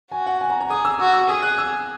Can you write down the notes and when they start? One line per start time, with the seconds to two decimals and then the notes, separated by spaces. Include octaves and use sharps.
0.11 F#4 G#5
0.27 F#5
0.41 G#5
0.50 A#5
0.61 A#5
0.70 G#4 D#6
0.85 E6
0.99 F#4 E6
1.13 E6
1.29 G#4 D#6
1.42 F#6
1.58 E6